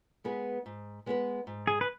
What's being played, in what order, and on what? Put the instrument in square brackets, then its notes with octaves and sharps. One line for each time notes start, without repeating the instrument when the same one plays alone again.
[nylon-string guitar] G#3 B3 G#4 B4
G#2
G#3 B3 G#4 B4
G#2
[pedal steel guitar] G#4
B4